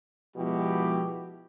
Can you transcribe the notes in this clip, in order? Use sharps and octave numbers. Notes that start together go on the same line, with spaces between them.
B2 F3 G#3 B3 E4 G4